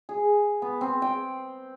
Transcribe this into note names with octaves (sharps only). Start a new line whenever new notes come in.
G#4
B3
C4
G5